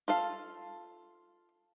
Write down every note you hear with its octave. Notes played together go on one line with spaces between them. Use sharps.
F4 A4 F5